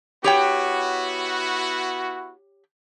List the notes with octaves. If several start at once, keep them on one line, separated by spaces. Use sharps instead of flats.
B3 E4 F#4 G4 C#5 G5